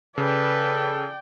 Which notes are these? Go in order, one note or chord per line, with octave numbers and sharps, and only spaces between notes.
C#3 A4 B4 D5 G5